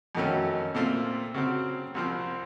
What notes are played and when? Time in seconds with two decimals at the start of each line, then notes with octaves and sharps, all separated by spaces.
0.15 F2 D#3 F#3 A3 C#4
0.75 A#2 A3 C4 F4
1.34 C#3 F#3 C4
1.94 C2 C3 F3 C4